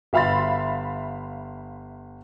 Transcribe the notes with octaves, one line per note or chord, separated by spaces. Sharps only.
G1 E5 F5 B5 C6 A6